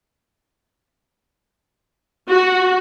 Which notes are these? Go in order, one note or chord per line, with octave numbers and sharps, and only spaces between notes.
F#4